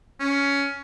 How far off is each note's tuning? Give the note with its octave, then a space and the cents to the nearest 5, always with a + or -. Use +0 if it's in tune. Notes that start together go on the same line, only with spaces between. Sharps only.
C#4 +15